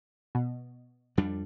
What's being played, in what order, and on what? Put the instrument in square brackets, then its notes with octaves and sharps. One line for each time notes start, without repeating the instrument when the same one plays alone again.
[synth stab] B2
[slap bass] F2 G3 D4